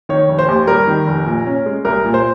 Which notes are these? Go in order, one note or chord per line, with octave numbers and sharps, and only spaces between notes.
D#3 C#5
F1
C5
D#2
G3 A#4
D#3
F1
A#2
C#4
G#3
C2 A#4
A#2
C5